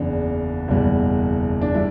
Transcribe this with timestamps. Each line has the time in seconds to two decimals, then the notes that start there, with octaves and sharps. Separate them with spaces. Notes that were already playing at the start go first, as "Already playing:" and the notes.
Already playing: F#1 E2 C#3 D4
0.68 F#1 E2 B2 G3
1.61 D4
1.74 G3 E4